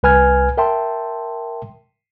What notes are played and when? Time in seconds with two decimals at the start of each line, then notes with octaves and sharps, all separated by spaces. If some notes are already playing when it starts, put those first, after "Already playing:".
0.03 C2 B4 G#5 F6 G#6
0.57 A#4 E5 G5 A5 C6